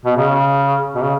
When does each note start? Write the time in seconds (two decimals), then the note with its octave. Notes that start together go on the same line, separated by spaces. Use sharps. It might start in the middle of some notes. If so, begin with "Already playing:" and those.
0.05 B2
0.16 C#3
0.95 B2
1.03 C#3